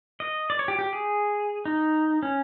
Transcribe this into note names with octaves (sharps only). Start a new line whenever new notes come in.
D#5
D5
C#5
G4
G4
G#4
D#4
C#4